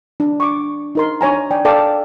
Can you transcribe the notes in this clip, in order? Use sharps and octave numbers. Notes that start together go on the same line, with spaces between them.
D4
C#6 D6
D#4 A#4 C6
D4 C#5 G#5 A#5
D5 G5 G#5
A4 D5 F5 G5 A5 D6